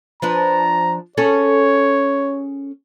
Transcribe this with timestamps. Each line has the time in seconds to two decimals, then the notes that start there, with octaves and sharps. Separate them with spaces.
0.22 F3 D4 B4 A#5
1.17 C#4 G#4 A4 C#5